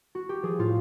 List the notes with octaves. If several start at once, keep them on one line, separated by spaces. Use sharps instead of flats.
F#4
G4
F3 G#4
A2 F4